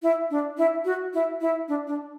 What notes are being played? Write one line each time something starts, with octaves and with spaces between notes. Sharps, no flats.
E4
D4
E4
F#4
E4
E4
D4
D4